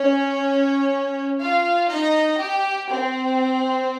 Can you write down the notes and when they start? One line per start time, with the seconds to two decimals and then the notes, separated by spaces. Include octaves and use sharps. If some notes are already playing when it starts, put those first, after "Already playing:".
Already playing: C#4 C#5
1.40 F4 F5
1.89 D#4 D#5
2.39 G4
2.89 C4